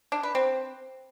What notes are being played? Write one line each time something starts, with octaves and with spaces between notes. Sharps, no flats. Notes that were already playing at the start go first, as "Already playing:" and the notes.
D4
B4
C4